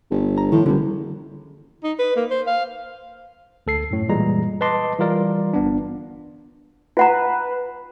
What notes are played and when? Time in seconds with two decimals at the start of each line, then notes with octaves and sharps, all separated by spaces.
0.10 G1
0.38 A#5
0.52 A2 D#3 F3
0.66 F#1 D3 G3
1.84 D#4
1.99 B4
2.16 A#3
2.31 C5
2.47 F5
3.67 D2 A4 C7
3.91 F#2 A2
4.09 A#2 E3 G3 G#3 A#5
4.61 B4 D#5 A5 C6 D6
4.99 E3 G3 F4 A#4 D5
5.53 G1 B3 D4
6.97 F4 B4 F#5 A#5